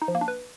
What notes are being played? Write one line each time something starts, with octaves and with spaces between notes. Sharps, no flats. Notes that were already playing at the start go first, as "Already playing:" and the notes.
D#4
F3
A#3
D4
B4